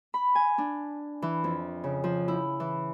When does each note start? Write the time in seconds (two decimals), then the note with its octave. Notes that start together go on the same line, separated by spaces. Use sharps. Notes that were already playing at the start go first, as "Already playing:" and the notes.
0.14 B5
0.35 G#5
0.58 D4
1.22 E3
1.44 F2
1.84 C#3
2.04 F3
2.28 E4
2.60 E3